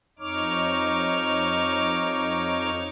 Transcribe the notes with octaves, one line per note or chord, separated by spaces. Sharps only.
F2 D#4 C#5 D6 F6